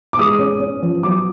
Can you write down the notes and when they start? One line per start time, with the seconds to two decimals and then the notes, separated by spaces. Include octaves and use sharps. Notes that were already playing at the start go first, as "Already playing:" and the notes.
0.13 D6
0.19 G#3 D#6
0.39 C#4
0.60 C#4
0.82 F3
1.03 F#3 D6